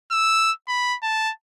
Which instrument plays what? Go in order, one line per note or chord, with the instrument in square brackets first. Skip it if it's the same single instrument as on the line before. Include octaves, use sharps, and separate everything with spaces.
[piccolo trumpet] E6
B5
A5